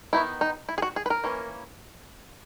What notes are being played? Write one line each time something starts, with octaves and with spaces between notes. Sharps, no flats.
D#3 F#3 B3 D#4 E4
D#4
E4
G#4
F#4
G#4
B4
A#4
E3 A#3 C#4